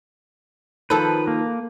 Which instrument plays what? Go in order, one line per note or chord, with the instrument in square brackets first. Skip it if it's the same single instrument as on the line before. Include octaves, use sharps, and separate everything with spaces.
[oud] D#3 F3 A4 [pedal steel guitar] B4
[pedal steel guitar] A#3